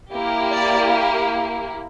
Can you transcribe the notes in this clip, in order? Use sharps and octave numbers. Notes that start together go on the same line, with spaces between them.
A#3 E4 G4
D5